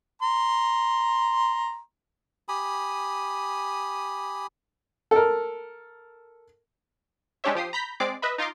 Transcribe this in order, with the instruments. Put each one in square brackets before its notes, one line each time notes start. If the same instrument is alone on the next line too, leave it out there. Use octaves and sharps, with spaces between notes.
[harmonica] A#5 C6
[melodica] G4 G#5 B5 D#6
[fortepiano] A4 A#4
[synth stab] G#3 C#4 D4 G4 C#5 E5
F3 G4 D#6 C7
A#5 B5 G6 B6
G#3 C4 D5 D6 C7
B4 D#5 E5 B5
D#4 F4 A#5 C6 D6